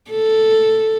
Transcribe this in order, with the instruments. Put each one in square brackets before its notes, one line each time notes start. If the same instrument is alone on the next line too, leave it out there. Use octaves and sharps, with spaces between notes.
[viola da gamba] A4